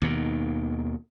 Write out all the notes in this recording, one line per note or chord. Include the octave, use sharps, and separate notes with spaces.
D#2 B2 D#3